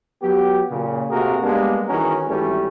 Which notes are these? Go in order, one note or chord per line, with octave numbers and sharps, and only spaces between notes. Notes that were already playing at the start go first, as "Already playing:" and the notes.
F#3 B3 G4
A#2 C#3
C3 A3 A#3 F#4 G#4 A#4
G3 G#3 A#3 B3 D4
D#3 E3 C#4 F#4 G#4 A#4
G#1 E3 G3 A3 C#4